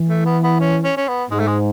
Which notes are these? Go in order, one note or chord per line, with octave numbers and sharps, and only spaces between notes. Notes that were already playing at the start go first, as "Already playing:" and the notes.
Already playing: E3
A3
B3
B3
C#4
C#4
C#4
B3
G#2 G#3
A3
G#3